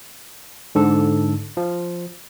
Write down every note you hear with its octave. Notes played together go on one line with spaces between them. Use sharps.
G#2 D3 A4
F3